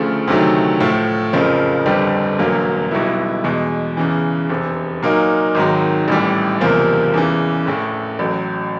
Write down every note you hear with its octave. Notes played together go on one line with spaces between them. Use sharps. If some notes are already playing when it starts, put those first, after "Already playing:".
Already playing: D2 C#3 F3 A3
D2 C3 D#3 F#3 A3
A2 F3 A3
F#1 F2 C#3 F3
G1 F2 D3 G3 C4
E1 D2 D3 F#3 A#3
B1 B2 G3 B3 E4
E2 B2 G#3
E2 C#3 E3
F1 E2 C3
A#2 F#3 A#3 D#4
G#1 G#2 D#3 F#3
A1 A2 E3 G3
F#1 E2 C3 F3 A#3
E2 C#3 E3
A#1 A2 E3 A3
A1 A2 F#3